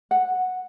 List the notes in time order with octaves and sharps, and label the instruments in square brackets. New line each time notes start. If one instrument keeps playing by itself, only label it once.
[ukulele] F#5